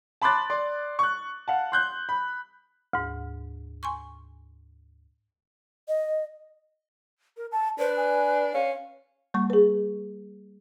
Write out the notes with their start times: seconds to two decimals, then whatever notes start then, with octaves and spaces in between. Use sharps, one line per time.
0.22 A5 B5 C6 D6 F#6 A6
0.50 D5 C6
0.99 C#6 F#6
1.48 F5 F#5 A5
1.72 C6 F#6 G6
2.09 B5
2.93 D2 G#2
3.83 G#5 C6 C#6
5.88 D#5
7.37 A#4
7.52 A5
7.79 D4 B4 C5
7.97 G#5
8.54 C#4 F5
9.34 G3 A#3 C#6
9.50 G#4 B4